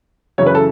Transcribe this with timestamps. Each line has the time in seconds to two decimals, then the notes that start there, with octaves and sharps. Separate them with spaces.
0.38 F#2 C#3 E3 C#5
0.47 B4
0.55 A4